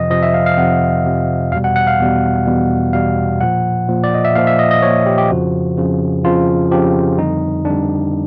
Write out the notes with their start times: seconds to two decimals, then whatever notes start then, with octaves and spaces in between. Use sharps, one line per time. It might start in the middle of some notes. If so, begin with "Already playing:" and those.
Already playing: F2 C3 F3 D#5
0.10 F2 C3 F3 D#5
0.23 E5
0.34 F5
0.46 F5
0.57 F2 C3 F3 F#5
1.05 F2 C3 F3
1.52 E2 B2 G3 F5
1.64 F#5
1.76 F#5
1.87 F5
1.99 E2 B2 G3
2.47 E2 B2 G3
2.93 E2 B2 G3 F5
3.41 A#2 F3 F#5
3.88 A#2 F3
4.04 D5
4.14 D#5
4.25 E5
4.35 A#2 F5
4.38 F3
4.47 E5
4.59 D#5
4.71 D#5
4.82 F3 C#5
4.86 A#2
5.06 G4
5.18 G4
5.29 F2 C#3 F3 F#4
5.77 F2 C#3 F3
6.24 F2 C#3 F3 F4
6.71 F2 C#3 F3 G4
7.18 F2 D3 G3 D#4
7.65 F2 D3 G3 D4